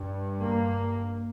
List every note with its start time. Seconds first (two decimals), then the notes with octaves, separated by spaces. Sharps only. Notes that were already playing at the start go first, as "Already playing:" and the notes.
Already playing: G2
0.41 A#3